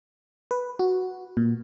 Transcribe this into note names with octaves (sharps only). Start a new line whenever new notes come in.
B4
F#4
A#2